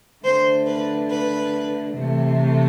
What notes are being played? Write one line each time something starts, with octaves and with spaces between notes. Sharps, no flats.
D3 A3 C5
B4
B4
C3 E3 A3